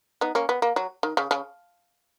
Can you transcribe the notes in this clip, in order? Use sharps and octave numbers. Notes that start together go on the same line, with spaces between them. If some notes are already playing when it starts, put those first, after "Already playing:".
B3 D#4
A#3 C#4
B3
A#3
F#3
D#3
C#3
C#3